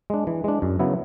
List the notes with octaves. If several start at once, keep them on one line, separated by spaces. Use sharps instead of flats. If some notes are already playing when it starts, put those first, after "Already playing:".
G#3 D4
E3
G#3 D4
F#2
C#3 F#3 B3 E4